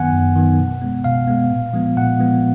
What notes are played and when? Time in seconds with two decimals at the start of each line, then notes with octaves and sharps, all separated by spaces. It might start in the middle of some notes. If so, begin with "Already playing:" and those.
Already playing: F#2 D#3 F#3 B3 F#5 G#5
0.13 F#2
0.36 D#3 F#3 B3
0.59 B2
0.82 G#3 B3
1.04 B2 F5
1.27 G#3 B3
1.50 A#2
1.74 F3 G#3 B3
1.97 A#2 F#5
2.19 F3 G#3 B3